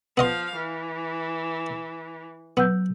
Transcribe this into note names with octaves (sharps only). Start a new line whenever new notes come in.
F3 B3 D#5 F5 C6
E3
F#3 B3 E6 G6